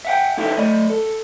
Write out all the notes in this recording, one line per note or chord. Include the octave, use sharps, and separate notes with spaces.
E5 F#5 G5
D#4 E4 G4 A4 E5 G5
A3 D5 D#5
A4